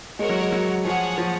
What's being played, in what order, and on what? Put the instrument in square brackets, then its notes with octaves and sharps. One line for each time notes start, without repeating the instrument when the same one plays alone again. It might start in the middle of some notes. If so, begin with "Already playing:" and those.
[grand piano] G#3 [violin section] F#4 A#4 C#5 F#5
[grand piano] F#3
G#3
F#3
[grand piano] F3 [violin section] G#4 C#5 F#5
[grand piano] F3